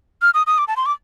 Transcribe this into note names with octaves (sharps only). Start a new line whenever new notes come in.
F6
D#6
D#6
D6
A5
C6
D6